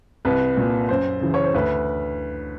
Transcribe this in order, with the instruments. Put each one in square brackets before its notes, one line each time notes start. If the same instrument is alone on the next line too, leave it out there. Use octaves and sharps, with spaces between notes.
[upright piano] C2 B4
A#2
F#2 C5
C#3 E3
C#5
C5
D2 B4